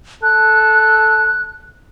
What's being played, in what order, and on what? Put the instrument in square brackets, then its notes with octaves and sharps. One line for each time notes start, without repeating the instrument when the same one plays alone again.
[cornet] A4 [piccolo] F#6